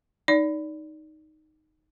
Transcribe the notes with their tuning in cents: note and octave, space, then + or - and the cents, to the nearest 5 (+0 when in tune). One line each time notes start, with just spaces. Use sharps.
D#4 +0 D5 -20